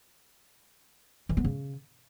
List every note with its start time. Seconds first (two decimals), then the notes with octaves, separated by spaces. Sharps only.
1.29 E3
1.37 B3
1.44 C#3